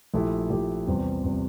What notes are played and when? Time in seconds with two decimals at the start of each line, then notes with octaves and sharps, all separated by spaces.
0.13 A#1 A#2 A3 E4 G4
0.50 A#1 A#2 A3 E4 G4
0.87 E2 C3 G3 C4
1.23 E2 C3 G3 C4